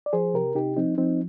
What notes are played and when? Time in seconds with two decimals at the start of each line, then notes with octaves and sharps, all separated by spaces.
0.06 D5
0.13 F3 G#4 C5
0.34 C3 G4 A#4
0.55 C3 D#4 G4
0.77 F3 C4 D#4
0.98 F3 C4 D#4